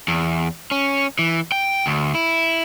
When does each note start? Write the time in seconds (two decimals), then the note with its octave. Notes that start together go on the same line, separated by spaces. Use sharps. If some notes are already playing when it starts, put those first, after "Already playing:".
0.08 E2
0.71 C#4
1.19 E3
1.52 G5
1.86 D2
2.15 E4